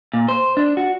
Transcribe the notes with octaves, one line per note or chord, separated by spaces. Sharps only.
A#2
C5
D4
F#4